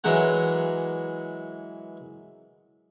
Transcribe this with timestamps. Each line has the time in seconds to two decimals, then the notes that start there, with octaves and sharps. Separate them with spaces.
0.04 E3 F#3 G#3 A#4 F#5